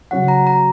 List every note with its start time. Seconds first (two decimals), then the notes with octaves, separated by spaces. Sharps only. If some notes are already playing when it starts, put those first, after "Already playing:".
0.11 C#3 F#3 C#4 F#4 F#5
0.28 A#5
0.47 A#5